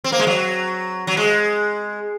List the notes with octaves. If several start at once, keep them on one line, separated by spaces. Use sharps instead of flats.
C4
A#3
G#3
F#3
F#3
G#3